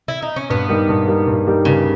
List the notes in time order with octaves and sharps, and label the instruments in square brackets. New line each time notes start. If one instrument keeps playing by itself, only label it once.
[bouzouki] E4
D#4
C#4
[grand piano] G2 [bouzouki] B3
[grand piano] G3 A#3 D#4 G4
G2
G3 A#3 D#4 G4
G2
G3 A#3 D#4 G4
[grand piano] G2 [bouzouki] C#3